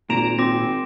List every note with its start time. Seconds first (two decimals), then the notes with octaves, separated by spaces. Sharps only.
0.10 G#1 A#2 A#5 D7 E7
0.38 C4 D6 A#6